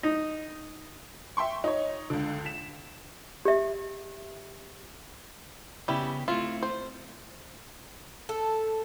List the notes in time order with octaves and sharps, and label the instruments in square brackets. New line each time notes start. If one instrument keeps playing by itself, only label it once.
[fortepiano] D#4
[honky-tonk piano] E5 G5 C6 C#6
D#4 C#5
C#2 D3
B6 E7
[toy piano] G4 E5
[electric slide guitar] C#3 B3 G4 [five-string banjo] G3 E4
[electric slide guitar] A3 C4 E4 [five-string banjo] F4
[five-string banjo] C5
[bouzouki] A4